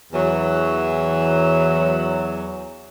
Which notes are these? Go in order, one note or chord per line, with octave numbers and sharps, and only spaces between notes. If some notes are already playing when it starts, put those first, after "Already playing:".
E2 E3 F#3